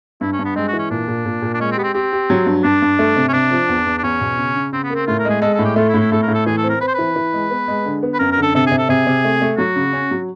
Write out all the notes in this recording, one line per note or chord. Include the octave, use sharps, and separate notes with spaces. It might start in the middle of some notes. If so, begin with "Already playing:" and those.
G2 E4
C#4
G2
B3
G#3 C4
F#4
E3
C#4
A#2 D4
A#2
A#2
A#2
D4
G#3 C#4
C4
B3 G4
C4
C4 G4
G4
F#3
G2
G2 D4
G2
A3
C3
C#4
C3 D4
F3
E2
E2
D4
E2 C#4
B2
C#3
C#3
C#3 C4
B3
A#3
C4
A2 F4
A#4
G#3
G#4
G#3 A4
A2 A4
G4
A3 F4
E4
A2
E4
A2 A4
A#4
A2
A4
E3 G#4
A4
C4
A#4
C4 B4
C5
E3 B4
E3
G#3
B3
G#3
D3
B3
B4
F#2 A#4
A#4
D3
A4
C3 A4
C3 G#4
A4
C3 G#4
C3
A3
A3
F#3 F#4
C#3
C#4
F#3